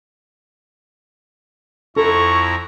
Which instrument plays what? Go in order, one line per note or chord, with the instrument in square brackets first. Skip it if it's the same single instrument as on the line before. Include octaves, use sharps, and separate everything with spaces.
[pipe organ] F2 E4 A#5 [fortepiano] A4 [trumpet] C#6